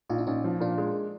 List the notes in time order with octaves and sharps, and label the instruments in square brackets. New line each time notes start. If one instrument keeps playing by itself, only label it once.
[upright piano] A#1 [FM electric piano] D#4 F4
[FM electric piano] D4 E4
[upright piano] A#1 [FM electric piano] C#4 D#4
[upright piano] F3
[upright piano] A#2 [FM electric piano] D4
[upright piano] G#3